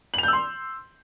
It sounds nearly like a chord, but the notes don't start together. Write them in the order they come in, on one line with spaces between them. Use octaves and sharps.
F#7 F7 G6 E6 C6